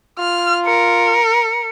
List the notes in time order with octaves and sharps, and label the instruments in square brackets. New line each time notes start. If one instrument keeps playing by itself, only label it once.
[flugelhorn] F4 [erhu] F6
[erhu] A#4 [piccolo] C#7